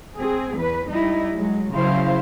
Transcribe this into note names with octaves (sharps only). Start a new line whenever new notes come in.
C4 G#4
E2 B4
G3 D#4 E4
F#3 G#3
C#3 F#3 E4 C5 F5